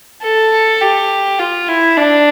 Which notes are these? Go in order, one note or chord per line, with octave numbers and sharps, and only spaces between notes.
A4
G4
F4
E4
D4